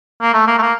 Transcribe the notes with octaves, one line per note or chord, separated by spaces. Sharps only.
A#3
A3
A#3
A3
A#3